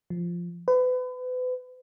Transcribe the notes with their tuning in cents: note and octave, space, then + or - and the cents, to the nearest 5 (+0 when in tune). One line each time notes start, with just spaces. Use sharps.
F3 -5
B4 +35